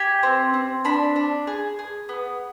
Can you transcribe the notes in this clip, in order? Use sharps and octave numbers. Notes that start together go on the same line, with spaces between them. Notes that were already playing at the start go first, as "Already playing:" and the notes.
Already playing: G4 G#5
C4
C4
D4 B5
D4
G#4
G#4
B3